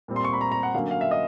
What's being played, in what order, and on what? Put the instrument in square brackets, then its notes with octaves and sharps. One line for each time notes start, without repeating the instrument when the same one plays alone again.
[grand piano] A#2 G3 C4
C6
C#6
B5
A#5
A#5
F#5
D3 F#3 A#3 C#4 F5
F5
E5
D#5